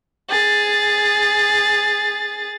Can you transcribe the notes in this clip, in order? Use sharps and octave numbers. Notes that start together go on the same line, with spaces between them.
G#4 A6